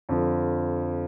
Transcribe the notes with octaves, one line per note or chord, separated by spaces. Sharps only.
F2 D3 F3